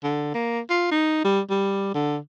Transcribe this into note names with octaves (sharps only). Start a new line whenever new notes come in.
D3
A#3
F4
D#4
G3
G3
D3